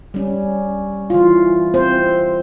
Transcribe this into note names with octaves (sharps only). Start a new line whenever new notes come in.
G3 C#4
E3 F4
C4 C5